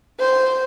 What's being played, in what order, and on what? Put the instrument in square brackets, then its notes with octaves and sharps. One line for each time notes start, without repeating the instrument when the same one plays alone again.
[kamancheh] C5